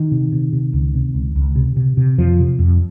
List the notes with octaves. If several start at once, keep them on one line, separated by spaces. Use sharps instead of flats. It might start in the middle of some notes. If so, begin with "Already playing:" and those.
Already playing: D#3
C3
C3
C3
C#2
C3
C#2
C#2
C3
C3
C3
F2 F3
C3
F2